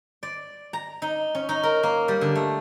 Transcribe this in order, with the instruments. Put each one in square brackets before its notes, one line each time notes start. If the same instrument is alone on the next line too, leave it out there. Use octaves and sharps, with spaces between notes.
[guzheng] D5
A#5
D#4
C#4
D#4
A#4
A#3
G3
D3
A3